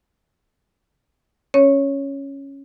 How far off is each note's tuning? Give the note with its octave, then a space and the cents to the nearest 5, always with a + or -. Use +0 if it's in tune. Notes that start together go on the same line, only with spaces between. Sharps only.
C#4 -5 C#5 +0